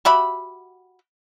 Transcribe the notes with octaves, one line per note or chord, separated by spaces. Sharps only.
F#4 G4 E5 B5